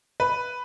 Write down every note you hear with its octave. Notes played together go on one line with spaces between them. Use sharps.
B4